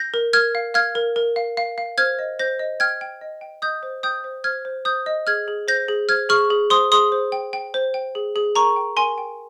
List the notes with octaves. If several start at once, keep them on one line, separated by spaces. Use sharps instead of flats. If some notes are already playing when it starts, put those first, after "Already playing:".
Already playing: G6 A#6
A#4
A#4 F6 G#6
F5
F5 F6 G#6
A#4
A#4
F5
F5
F5
C5 F6 G#6
D#5
C5 G6 A#6
D#5
G5 F6 G#6
G5
D#5
G5
D#5 D#6 G6
C5
G5 D#6 G6
C5
C5 F6 G#6
C5
C5 D#6 G6
D#5
G#4 F6 G#6
G#4
C5 G6 A#6
G#4
C5 F6 G#6
G#4 C#6 F6
G#4
C5 C6 D#6
G#4 C6 D#6
C5
G5
G5
C5
G5
G#4
G#4
A#4 A#5 C#6
G5
A#4 G#5 C6
G5